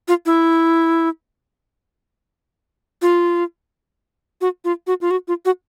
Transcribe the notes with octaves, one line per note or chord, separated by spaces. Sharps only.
F4
E4
F4
F#4
F4
F#4
F4
F#4
F4
F#4